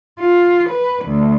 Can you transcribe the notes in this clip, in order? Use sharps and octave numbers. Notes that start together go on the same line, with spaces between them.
F4
B4
D2